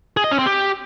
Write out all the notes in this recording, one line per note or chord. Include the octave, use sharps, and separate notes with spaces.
G#4
D#5
C#4
C4
G4